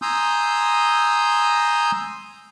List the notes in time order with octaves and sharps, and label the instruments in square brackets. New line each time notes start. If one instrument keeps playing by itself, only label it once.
[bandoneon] G#5 A#5 C6 D#6 E6 G6